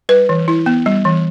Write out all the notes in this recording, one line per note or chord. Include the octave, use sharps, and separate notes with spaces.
G3 B4
E3
E4
B3
G3
E3